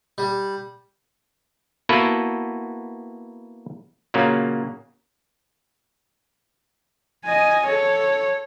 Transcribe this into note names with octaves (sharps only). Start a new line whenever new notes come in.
G3
A#3 B3 E4 F#4 A4 B4
A#2 C#3 F#3 A#3
D#5 G#5
A4 C#5